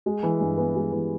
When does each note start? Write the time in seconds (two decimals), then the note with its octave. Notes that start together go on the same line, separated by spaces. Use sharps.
0.06 G#3
0.23 E3
0.41 G2
0.57 B3
0.76 G#3
0.92 E3